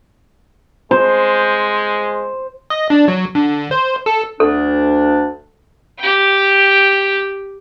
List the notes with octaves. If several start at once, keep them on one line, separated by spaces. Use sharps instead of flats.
G#3 C5
D#5
D4
F#3
D3
C5
A4
D2 D4 A4
G4 G5